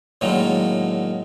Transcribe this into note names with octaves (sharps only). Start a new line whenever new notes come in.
A2 D3 D#3 F#3 G#3 A#3